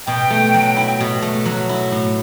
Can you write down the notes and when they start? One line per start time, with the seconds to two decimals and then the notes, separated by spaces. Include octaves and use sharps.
0.07 B2 G5
0.30 A3
0.54 F#3
0.77 E4
1.00 B2
1.22 A3
1.46 F#3
1.69 E4
1.92 A2